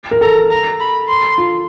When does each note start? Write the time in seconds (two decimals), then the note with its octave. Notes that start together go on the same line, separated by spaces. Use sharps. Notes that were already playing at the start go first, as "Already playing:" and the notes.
0.11 A#4
0.21 A4 A#5
0.50 A#5
0.80 B5
1.09 C6
1.38 F4